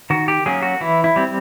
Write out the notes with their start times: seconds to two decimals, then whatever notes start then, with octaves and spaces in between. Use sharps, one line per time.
0.10 D#3 F#4
0.28 G4
0.46 F#3 A#3 C#4 G#4
0.62 F#4
0.81 E3 E4
1.04 E4
1.16 G3 C4